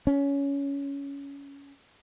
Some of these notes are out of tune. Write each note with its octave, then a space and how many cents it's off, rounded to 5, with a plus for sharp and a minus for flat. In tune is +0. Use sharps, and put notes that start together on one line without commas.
C#4 +15